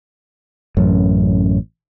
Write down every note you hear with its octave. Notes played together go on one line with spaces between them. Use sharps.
A1 F#2